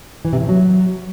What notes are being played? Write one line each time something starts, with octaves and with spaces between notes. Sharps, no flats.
E3
C3
A2
F#3